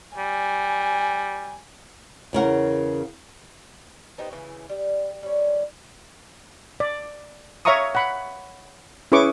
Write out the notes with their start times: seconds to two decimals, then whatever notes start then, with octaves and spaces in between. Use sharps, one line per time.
0.18 G3 G#5
2.33 E2 C#3 A#4 F#5
4.18 B3 D#4 G4 C5
4.32 C#3 E3
4.69 G3
5.23 G3 C#4
6.80 D5
7.65 C#5 E5 F5 A#5 C#6 D#6
7.95 F#5 B5
9.12 C#4 E4 G#4 B4 C#6 D6